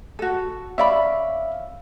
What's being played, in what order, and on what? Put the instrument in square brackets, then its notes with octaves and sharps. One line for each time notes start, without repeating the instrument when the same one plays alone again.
[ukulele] F#4 A4
[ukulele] C#4 D5 B5 [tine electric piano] E5 F5